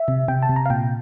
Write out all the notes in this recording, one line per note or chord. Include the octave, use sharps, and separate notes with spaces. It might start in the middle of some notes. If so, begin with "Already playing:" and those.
Already playing: E5
C3
C3 G5
A5
C3
A#5
F5
A#2 G5